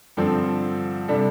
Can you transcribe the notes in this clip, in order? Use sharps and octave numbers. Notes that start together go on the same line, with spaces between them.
G2 D3 F3 C4 A4
C3 G3 D4 A4